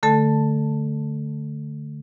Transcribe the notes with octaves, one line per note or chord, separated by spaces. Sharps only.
D3 A3 A4 A5